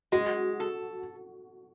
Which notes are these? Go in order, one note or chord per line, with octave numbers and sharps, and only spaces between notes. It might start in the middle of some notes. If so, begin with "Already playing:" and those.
G#3 F#4
A4